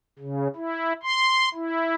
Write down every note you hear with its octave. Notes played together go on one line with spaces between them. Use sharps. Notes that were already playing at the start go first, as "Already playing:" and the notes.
C#3
E4
C6
E4